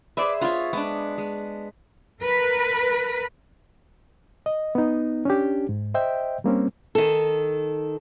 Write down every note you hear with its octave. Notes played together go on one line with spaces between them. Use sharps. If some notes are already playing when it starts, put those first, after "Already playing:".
G#4 B4 C5 D5 E5
B3 F4 C#5 F#5
G#3 B3 D4
G#3
A#4 B4
D#5
B3 D#4
C#4 D4 G4
G#2
C5 D#5 E5 G5
G3 A#3 C4 C#4
D#3 A4